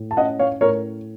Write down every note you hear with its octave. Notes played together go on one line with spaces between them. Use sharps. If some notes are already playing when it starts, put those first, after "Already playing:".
Already playing: A2
A5
C#4 D#5 F#5
C#5 F5
A2 A#4 C#5